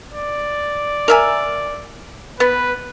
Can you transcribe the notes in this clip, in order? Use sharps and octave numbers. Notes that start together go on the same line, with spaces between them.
D5
A#4 E5 G#5
B3 B4